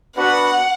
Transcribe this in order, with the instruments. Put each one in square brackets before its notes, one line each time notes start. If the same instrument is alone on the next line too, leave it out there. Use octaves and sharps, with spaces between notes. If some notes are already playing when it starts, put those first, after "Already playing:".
[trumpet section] B3 D4 F#4 B4 [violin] F#5